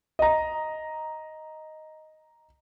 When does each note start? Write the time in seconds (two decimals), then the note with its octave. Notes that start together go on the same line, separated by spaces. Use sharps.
0.19 D#5 A#5